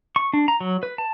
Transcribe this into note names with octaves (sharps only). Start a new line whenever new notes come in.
C#6
D4
A#5
F#3
B4
A5